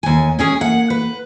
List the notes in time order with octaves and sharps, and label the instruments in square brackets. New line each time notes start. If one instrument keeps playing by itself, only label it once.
[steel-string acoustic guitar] D#2 G#5
G#3 C#4 G#4
[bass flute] A#3 [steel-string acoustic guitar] F#5
[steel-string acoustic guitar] B4